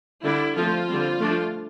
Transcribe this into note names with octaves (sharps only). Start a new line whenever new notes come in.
D3 G3 D4 E4
F3 A3 C4 F4
D3 G3 C4
F3 A3 D4